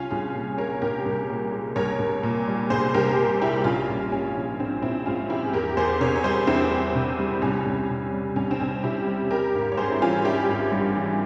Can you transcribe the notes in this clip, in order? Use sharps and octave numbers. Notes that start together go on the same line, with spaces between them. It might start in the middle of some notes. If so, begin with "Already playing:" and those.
Already playing: C2 C#4 F4
C2 F4 G#4
A#2
G#3 A#4 C#5
C2 G4 A#4
C2
A#2
G#3
C2 A#4 C#5
C2
A#2
G3
C2 G#4 C5
C2 G4 A#4
A#2
G3 E4 G4
A#1 C#4 F4
A#1
G#2 C#4
F3
A#1 C4
A#1 C4 E4
G#2 C#4 F4
F3 E4 G4
G#4
E2 G4 A#4
E2 G#4 C5
C3 A#4 C#5
C#5
G3 G#4 C5
E2 C4 E4
E2
C3
G3
C2 C#4
C2
C3
G3
C2 C#4
C4
C2 C#4
C3 E4 G4
G3
G3 G4 A#4
G#1
C#5
G2 G#4 C5
E4
E3 C#4 F4
G3 E4 G4
G#1
G2
E3